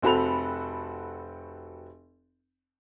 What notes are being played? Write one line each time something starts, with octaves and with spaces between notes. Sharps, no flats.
F1 C4 F#4 A4 B5 F7